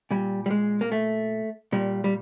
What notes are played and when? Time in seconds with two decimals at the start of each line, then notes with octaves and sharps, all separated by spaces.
0.11 A#2 G3
0.46 G3
0.51 G#3
0.81 A#3
0.92 A3
1.72 A#2 G3
2.04 G3